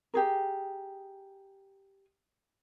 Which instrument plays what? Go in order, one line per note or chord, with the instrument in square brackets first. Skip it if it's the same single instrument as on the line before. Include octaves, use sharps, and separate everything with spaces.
[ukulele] G4 G#4 A#4